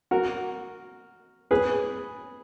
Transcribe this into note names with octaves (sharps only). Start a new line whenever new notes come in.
F#4 A#4
G#4 B4